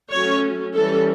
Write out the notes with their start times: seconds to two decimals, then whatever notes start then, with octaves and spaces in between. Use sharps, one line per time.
0.12 F#3 A3 C#4 C#5
0.75 E3 G3 C#4 A4